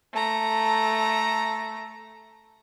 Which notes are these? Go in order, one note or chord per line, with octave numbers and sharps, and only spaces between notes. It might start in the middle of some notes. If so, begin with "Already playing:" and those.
A3 A#5